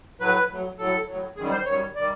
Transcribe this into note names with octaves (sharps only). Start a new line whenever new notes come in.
A2 F#3 B4
A2 F#3
A2 F#3 A4
A2 F#3
F#2 D#3 G3 G#4
C5
F#2 D#3 G3 C#5
D#3 G3 D5